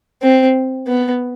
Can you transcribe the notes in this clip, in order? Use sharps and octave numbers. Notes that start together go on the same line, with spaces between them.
C4
B3